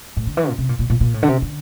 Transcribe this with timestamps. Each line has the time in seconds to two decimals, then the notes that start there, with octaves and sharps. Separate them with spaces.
0.17 A2
0.27 D3
0.37 E3
0.48 A#2
0.58 C3
0.69 A#2
0.79 A#2
0.90 A#2
1.00 A#2
1.14 A2
1.23 D3
1.28 C3
1.42 D3